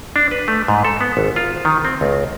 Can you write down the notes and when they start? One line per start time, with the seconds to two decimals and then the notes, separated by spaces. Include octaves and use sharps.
0.16 D4
0.31 B4
0.48 A3
0.68 G#2
0.84 A4
1.01 B3
1.17 G#1
1.36 F4
1.65 D#3
1.85 C4
2.01 C#2